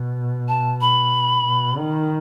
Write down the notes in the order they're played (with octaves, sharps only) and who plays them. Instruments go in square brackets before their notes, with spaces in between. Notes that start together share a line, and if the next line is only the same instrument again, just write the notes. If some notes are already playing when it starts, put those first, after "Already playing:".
Already playing: [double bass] B2
[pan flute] A5
B5
[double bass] B2
D#3